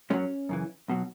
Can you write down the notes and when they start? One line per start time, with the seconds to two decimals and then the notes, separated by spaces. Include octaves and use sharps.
0.10 F#2 G#3 C#4
0.14 F#3
0.49 F#2 C#3 E3
0.88 B1 B2 F#3